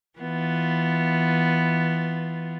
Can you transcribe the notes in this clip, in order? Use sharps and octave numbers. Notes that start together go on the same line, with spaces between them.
E3 B3 F4